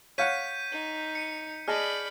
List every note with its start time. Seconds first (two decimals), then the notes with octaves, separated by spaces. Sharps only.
0.18 C#5 F5 F#5 G6 B6 D#7
0.72 D#4
1.15 C#7
1.68 G#4 D5 D#5 A5 B5 F6